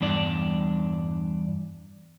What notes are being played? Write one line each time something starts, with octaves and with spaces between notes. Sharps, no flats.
E2 G2 D4 D5